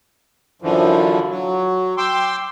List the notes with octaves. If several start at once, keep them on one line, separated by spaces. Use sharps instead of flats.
F#2 D3 E3 F3
F#3
G5 C6 D6 E6